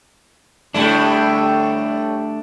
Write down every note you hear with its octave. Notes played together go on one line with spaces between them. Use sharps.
A2 G3 A3 D4 E4